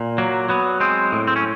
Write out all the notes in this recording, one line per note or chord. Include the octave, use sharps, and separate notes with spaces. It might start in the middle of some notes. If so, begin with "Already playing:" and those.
Already playing: A#2
F#3 A#3
F#3 B3
G#3 C4
A2
C4
C#4